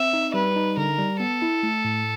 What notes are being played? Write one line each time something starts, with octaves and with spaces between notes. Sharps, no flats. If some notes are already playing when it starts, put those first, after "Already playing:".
Already playing: C4 E5
D#4
G3 B4
D#4
D3 A#4
G3
B3 A4
E4
A3
A2